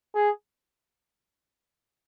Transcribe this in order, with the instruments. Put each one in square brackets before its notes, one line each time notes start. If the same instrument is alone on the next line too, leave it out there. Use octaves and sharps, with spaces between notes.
[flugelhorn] G#4